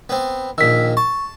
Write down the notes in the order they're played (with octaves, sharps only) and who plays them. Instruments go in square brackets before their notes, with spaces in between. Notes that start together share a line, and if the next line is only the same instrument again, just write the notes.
[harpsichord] B3 C4
[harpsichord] A#1 D#3 [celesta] E6 B6
[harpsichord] A5 [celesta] C#6